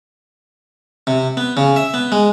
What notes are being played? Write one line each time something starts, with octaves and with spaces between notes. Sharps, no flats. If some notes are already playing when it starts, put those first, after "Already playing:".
C3
B3
C#3
E5
B3
G#3